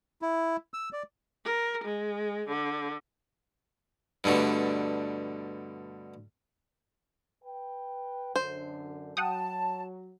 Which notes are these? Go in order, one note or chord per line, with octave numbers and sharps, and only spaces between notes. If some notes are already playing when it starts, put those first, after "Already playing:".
E4
E6
D5
A#4
G#3
D3
G2 B2 D3 A3
B4 G5
F#2 D3 C5
F#3 F#5 G5 A5 D#6